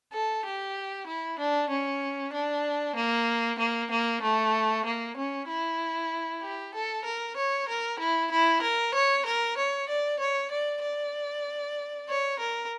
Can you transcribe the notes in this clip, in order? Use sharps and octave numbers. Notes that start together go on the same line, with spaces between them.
A4
G4
E4
D4
C#4
D4
A#3
A#3
A#3
A3
A#3
C#4
E4
G4
A4
A#4
C#5
A#4
E4
E4
A#4
C#5
A#4
C#5
D5
C#5
D5
D5
C#5
A#4